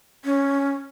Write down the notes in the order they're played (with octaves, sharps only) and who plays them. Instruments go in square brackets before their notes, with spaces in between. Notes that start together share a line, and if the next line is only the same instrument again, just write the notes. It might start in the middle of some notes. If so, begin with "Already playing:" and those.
[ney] C#4